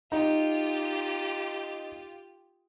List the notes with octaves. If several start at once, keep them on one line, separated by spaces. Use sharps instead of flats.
D#4 F4 G4